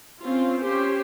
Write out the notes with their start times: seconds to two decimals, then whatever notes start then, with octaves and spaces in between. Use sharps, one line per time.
0.21 C4 C#4 F4
0.60 C#4 G4 C5